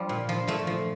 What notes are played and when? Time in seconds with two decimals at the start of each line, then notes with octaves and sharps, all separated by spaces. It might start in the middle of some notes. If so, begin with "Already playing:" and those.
Already playing: F3 G3
0.09 A#2
0.29 F3
0.47 A#2 A3
0.67 F3